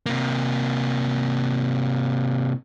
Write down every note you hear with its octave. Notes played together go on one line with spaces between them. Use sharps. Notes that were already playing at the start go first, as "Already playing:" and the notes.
C3 A#3